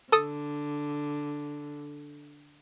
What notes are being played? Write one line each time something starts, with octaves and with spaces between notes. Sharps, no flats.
D3 A4 D#6